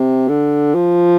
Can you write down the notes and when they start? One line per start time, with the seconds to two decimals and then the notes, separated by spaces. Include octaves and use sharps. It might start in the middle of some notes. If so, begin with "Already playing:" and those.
Already playing: C3
0.29 D3
0.75 F3